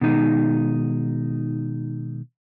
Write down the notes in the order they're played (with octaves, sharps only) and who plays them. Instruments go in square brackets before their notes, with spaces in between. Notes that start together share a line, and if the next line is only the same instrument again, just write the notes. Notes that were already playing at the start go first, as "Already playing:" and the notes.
[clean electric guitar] B2 D#3 G#3 D#4